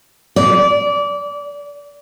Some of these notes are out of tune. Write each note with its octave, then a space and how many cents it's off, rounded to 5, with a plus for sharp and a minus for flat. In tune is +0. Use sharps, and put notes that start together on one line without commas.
D5 -25